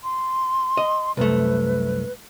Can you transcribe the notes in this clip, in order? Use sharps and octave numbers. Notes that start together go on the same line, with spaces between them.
C6
D#5
C2 F#2 A3 B4